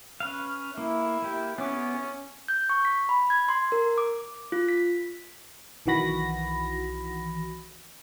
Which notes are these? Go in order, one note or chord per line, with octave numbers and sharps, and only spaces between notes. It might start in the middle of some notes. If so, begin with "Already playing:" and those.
C#4 B4 F5
A#3 E4
A#3 G4
B3 C#4 D6
G6
C#6
B6
B5
G#6
C6
A#4
D6
F4
B6
B1 D#3 E3 F#4 B5 A#6